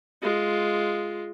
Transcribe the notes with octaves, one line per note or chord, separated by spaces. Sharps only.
G#3 F4